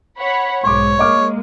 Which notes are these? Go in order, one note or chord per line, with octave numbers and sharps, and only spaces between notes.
C#5 F#5 B5
B1 G#2 C#5 C6 D6
G#3 A#3 D#5 D6 F6